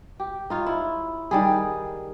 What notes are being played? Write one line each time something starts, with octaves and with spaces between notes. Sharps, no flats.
G4
D#4 F4 C#5
E4
D#3 G3 G#4